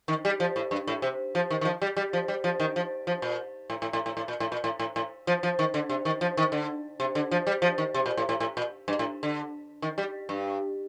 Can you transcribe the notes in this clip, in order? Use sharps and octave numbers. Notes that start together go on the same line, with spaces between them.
D#3
G3
F3
A2
G2
A2
C3
F3
D#3
D#3
F3
G3
G3
F3
G3
F3
D#3
F3
F3
A#2
A2
A2
A2
A2
A2
A#2
A2
A#2
A2
A2
A2
F3
F3
D#3
D3
C3
D#3
F3
D#3
D3
C3
D3
F3
G3
F3
D#3
C3
A#2
A2
A2
A2
A#2
G2
A2
D3
D#3
G3
G2